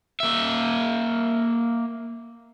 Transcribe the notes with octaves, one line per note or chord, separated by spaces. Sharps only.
A#3 E5